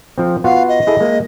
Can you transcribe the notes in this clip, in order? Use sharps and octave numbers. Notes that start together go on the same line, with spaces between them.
F3 C4
B3 F4 F#4 F5
D#5
E4 G#4 A4
G#3 A#3